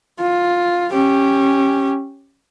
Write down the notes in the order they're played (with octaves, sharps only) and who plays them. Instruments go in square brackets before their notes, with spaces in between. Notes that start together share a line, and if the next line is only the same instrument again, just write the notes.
[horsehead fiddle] F4
C#4 G4